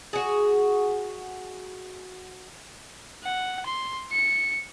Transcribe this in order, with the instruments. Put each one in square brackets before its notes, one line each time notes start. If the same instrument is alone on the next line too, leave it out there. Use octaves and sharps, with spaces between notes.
[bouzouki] F#4 G#4
[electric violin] F#5
C6
C#7